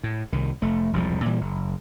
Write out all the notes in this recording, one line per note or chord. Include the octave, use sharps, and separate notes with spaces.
A2
C2 D#3
F1 A3
E1 C2 A#2 F3
A#2 E3 G3
F#1